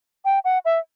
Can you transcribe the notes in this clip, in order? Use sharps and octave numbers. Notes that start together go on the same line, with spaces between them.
G5
F#5
E5